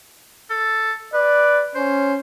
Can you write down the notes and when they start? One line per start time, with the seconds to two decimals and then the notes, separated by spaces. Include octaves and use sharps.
0.50 A4
1.14 B4 D5
1.75 C#4 C5